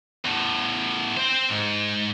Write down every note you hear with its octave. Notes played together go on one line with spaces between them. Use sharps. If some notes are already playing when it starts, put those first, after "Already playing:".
E2 A2
C4 C5
G#2